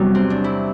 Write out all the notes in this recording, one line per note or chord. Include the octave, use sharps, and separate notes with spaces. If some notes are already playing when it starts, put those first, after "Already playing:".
Already playing: E2 C3 F#3 G3 D4
C4
D4
E4